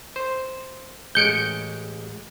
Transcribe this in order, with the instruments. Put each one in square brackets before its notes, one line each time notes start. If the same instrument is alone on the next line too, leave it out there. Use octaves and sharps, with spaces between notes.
[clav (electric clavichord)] C5
[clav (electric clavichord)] A1 G#3 [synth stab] G6 C#7 D7